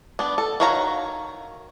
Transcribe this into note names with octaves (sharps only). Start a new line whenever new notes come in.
B3 D4
A4
D#3 F#4 C#5 F5 A#5